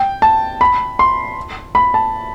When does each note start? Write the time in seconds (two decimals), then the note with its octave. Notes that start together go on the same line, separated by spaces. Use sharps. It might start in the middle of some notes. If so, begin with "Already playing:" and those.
Already playing: G5
0.22 A5
0.61 B5
0.99 C6
1.75 B5
1.94 A5